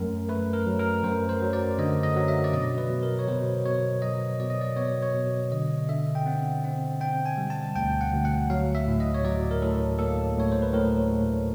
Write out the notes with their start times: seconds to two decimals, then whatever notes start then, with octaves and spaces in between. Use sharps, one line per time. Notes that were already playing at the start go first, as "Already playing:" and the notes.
Already playing: F#2 A3 A#4
0.29 A3 B4
0.53 A#4
0.67 F#3
0.79 A#4
1.03 F#2 C5
1.29 C5
1.41 F#3
1.53 D5
1.78 D3 D#5
2.03 D#5
2.16 F#3
2.28 E5
2.44 D5
2.53 B2 D#5
2.78 B4
2.90 B2
3.03 A#4
3.19 C#5
3.28 B2 C5
3.66 B2 C#5
4.02 F#3 D#5
4.39 B2 D5
4.50 D#5
4.61 D5
4.76 B3 C#5
5.02 C#5
5.14 B2
5.52 D3 D#5
5.89 D3 E5
6.15 G5
6.26 C4 F#5
6.64 C4
7.00 C4 G5
7.26 G#5
7.38 G3
7.50 A5
7.76 D2 G5
8.01 F#5
8.12 D2
8.25 F#5
8.50 F#3 F5
8.75 E5
8.87 A2
9.00 D#5
9.14 C#5
9.24 F#3 D5
9.51 A#4
9.62 A2 A4
9.99 A#3 A4
10.37 A2 C#5
10.52 C5
10.62 B4
10.73 A2 A#4
11.12 A2